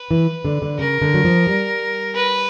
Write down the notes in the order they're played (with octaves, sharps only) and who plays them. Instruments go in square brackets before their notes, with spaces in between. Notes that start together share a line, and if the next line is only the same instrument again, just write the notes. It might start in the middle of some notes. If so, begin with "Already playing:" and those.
Already playing: [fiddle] B4
[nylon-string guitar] E3
D3
D3
[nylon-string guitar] C#3 [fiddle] A#4
[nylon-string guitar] D3
F#3
F3
G3
[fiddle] B4